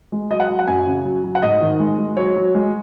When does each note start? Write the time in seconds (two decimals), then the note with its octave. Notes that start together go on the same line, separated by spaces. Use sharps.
0.12 G#3
0.31 F#3 D#5
0.40 F#5
0.49 F#3
0.59 F#5
0.67 F#2 G#5
0.87 C#3
1.05 F#3
1.24 F#3
1.35 F#5
1.42 G#2 D#5
1.61 D#3
1.80 G#3
1.98 G#3
2.17 F#3 C#5
2.36 F#3
2.54 G#3